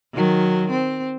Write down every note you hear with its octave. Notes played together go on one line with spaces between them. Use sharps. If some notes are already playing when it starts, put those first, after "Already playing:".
D#3 F#3
C4